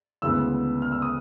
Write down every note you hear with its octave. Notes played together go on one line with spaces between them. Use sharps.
D2 C#3 E3 G#3 B3 E6
F6
E6
D#6